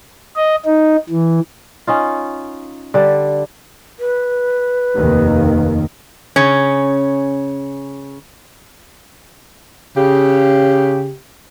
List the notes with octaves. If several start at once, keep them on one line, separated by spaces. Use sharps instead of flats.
D#5
D#4
E3
C#4 D#4 F4
D3 G3
B4
F1 D#2 D#3
C#3 C#4
C#3 G4